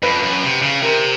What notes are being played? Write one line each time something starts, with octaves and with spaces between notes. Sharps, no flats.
F2 B4
F#2
C3
C#3
C3 A#4